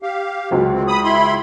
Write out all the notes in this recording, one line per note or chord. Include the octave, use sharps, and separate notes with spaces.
G4 F5
C#2 F#3 G#3
D2 C4
B5 D#6
E4 B5 C6